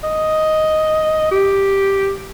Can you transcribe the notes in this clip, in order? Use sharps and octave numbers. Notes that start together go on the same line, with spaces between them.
D#5
G4